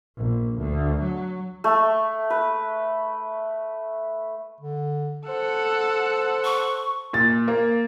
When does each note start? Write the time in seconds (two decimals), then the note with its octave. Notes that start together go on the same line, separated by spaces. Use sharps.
0.18 A#1
0.59 D2
1.03 F#3
1.64 A3
2.30 B4
4.61 D3
5.28 A4 C5 F#5
6.45 C#6
7.13 A#2 A6
7.48 A#3